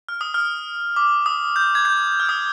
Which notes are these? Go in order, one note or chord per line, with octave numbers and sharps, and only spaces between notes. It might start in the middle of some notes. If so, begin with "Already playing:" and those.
F6
D#6
F6
D6
D#6
G6
G#6
G6
F6
D#6